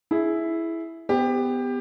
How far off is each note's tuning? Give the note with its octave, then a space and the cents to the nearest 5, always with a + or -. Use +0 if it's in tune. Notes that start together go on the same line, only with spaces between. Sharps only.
E4 +0 G#4 +15
B3 +15 G4 +20 C5 -20